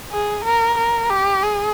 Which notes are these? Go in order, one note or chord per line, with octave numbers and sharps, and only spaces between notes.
G#4
A#4
A#4
G4
G#4